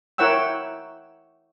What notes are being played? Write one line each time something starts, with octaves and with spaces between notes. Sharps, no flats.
E4 A#4 C#5 F#5 G5 E6